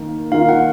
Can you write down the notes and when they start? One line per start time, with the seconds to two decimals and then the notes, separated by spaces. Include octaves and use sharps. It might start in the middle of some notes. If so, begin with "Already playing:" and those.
Already playing: D#3 A#3
0.32 D#3 A#3 F4 F5
0.49 F#5